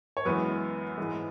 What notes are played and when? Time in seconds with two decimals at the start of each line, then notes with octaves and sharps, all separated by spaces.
0.17 C#5
0.25 F#2 E3 G#3 B3 B4
0.97 G#2 E3 G#3